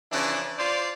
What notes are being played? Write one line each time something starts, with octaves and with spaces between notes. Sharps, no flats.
C#3 E3 F3 D4
F4 C5 D5